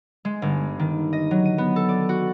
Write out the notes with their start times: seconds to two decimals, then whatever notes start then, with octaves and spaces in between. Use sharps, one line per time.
0.25 G#3
0.42 G1
0.79 D#3
1.13 D#5
1.31 F#3
1.45 D#7
1.58 B3
1.76 A4
1.89 D5
2.09 F#4